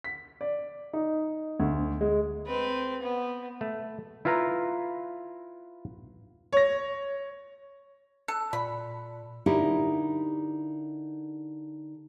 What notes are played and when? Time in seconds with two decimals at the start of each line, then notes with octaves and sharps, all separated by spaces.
0.04 B6
0.41 D5
0.93 D#4
1.60 D2
2.01 G#3
2.46 C4 B4
3.02 B3
3.61 A3
4.25 E4 F4 B4 F5 A#5
6.53 C#5 A#6
8.28 A4 F#6
8.53 A#2 B5
9.46 D3 D#4 E4 G4 A#4